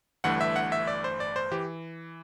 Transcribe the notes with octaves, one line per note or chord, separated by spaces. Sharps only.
G1 G2 E3 A3 F#5
E5
F#5
E5
D5
C5
D5
C5
E3 G4